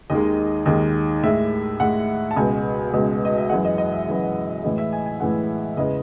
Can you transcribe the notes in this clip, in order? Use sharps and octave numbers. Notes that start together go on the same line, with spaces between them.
D#2 D#3 G#3 D#5
D#2 D#3 G#3
A2 G#3 E5
A2 G#3 F#5
A5
C#2 B2 G#3 G#5
C#2 B2 G#3
D#5
E5
F#2 E3 G#3 F#5
D#5
D#5
E5
F#2 E3 G#3
A2 E3 G#3 D#5
E5
G#5
G#5
A2 E3 G#3 F#5
E2 C#3 E3 G#3 D#5